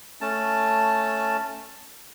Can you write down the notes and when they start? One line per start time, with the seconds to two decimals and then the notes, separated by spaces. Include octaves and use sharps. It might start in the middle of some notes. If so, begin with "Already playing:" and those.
0.21 A3 C#4 A5